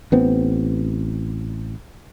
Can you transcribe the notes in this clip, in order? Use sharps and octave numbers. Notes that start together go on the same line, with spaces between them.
A1 B3 C4